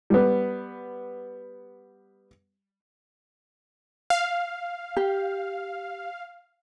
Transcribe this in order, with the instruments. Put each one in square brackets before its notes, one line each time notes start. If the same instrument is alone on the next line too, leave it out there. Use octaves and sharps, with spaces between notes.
[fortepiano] G3 B3
[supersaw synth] F5
[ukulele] G4